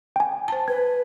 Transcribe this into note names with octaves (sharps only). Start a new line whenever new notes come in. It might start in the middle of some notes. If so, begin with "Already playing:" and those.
G5 G#5
C5 A5
B4 G#6